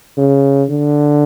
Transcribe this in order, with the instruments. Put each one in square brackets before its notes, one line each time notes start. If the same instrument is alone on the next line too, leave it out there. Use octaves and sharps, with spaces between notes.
[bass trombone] C#3
D3